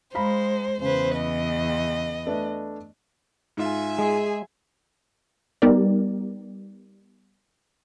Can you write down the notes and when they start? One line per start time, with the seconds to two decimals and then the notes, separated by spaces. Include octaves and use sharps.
0.15 G#3 C5 F5 A#5 B5
0.82 E2 C#3 B4 C5
1.17 D#5
2.26 A3 D4 B4
3.57 G#2 F4 E5 G#5
3.99 G#3 G#4
5.62 G3 B3 D#4 G4 A#4 D5